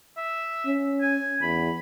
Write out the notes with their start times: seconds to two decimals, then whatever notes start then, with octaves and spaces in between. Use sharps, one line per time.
0.17 E5
0.67 C#4
1.01 G#5
1.42 E2 B5